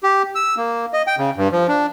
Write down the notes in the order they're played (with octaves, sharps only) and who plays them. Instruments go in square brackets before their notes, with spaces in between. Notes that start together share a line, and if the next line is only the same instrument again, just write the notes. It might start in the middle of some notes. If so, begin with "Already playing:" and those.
[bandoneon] G4
E6
A#3
D#5
G5
C#3
G2
F3
D4